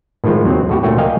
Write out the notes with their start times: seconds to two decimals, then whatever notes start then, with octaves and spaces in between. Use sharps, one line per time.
0.24 A2 D#3 F3 G#3 F4
0.45 D#2 F#3 C4
0.69 A2 F#4 G4
0.83 D2 A#2 A3 F#4 C#5 G5
0.98 A#4 D5 D#5 F5 G5 G#5